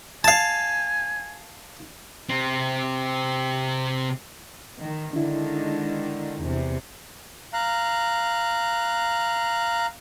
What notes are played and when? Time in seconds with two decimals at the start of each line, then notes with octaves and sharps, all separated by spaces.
0.24 F5 G#5 A5
2.29 C3 C4
4.80 D#3
5.13 D3 D#3 G#3 D4 E4
6.40 E2 C3
7.53 F5 A#5 F#6